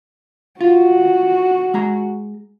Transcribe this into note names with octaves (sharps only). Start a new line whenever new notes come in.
F4 F#4
G#3 A#5